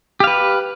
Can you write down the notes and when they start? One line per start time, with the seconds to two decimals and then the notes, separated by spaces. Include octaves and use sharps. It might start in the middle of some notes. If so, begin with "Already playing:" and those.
0.20 G4
0.24 F5
0.27 B4